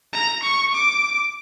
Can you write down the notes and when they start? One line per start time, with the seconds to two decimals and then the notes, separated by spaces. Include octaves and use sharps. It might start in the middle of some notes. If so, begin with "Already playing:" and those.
0.13 A#5
0.43 C#6
0.74 D6